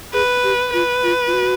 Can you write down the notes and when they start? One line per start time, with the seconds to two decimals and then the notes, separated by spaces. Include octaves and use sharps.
0.13 G#4 B4
0.44 G4
0.73 F4 B4
1.03 F4
1.27 F4
1.33 F#4